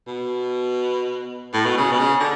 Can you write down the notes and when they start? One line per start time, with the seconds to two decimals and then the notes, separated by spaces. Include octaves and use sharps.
0.07 B2
1.53 A2
1.65 B2
1.77 C#3
1.92 B2
1.99 C#3
2.20 D3